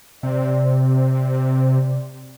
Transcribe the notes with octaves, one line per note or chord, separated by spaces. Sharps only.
C3 D5